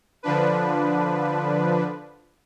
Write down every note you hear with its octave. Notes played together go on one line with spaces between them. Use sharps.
D3 F3 D4 B4